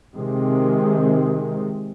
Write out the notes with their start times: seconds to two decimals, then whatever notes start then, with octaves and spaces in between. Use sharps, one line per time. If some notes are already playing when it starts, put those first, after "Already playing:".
0.14 C3 D#3 G#3